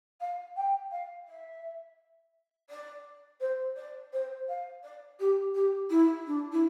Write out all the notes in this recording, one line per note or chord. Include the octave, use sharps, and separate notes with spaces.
F5
G5
F5
E5
D5
C5
D5
C5
F5
D5
G4
G4
E4
D4
E4